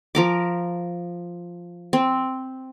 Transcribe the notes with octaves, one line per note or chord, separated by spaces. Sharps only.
F3 A#4 D6
C4